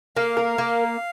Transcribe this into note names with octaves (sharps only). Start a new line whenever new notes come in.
A#3 F5
A#4
A#3